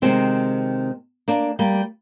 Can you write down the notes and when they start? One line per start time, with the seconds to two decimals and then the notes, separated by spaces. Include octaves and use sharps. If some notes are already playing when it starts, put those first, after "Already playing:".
0.02 C3 D#3 G#3 C4
1.28 A#3 D4
1.59 G3 A#3